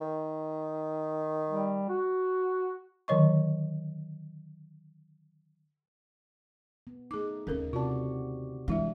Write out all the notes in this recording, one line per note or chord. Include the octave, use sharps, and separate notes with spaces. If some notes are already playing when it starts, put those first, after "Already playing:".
D#3
G3
F#4
D3 D#3 F#3 C#5 D#5 C#6
B3
A3 D#4 G#4 D6
D#2 C#3 C#4 A4 A#4
C3 F4 F#4 D5 A5
E3 G3 G#3 D4 E4 E5